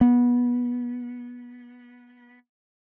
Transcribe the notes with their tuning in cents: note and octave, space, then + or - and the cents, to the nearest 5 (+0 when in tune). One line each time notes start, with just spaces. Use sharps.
B3 -20